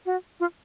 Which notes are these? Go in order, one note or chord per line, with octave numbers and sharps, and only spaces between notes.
F#4
F4